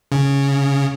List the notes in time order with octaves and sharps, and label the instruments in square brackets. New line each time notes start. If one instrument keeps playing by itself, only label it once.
[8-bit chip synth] C#3